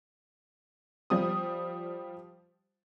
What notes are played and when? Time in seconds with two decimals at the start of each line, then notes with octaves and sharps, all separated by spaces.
1.10 F3 G3 D#6